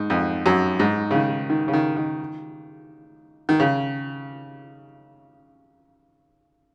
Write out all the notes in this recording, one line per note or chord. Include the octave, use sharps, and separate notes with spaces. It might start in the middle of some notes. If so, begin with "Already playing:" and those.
Already playing: G#2
F2
F#2
G#2
C#3
D#3
D#3
C#3
D#3
D#3
D#3
C#3